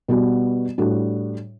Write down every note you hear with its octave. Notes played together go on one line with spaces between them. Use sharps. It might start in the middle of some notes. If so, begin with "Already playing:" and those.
B2 G3 B3 F#4
A2 G3 D4 F#4